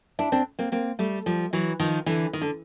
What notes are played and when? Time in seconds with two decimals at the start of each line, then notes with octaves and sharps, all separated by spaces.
0.19 D4 E4
0.32 C4 D4
0.59 A#3 C4
0.72 A#3 C4
0.99 G3 A3
1.26 F3 G3
1.53 E3 F#3
1.80 D#3 F3
2.06 D3 E3
2.33 D#3
2.41 D3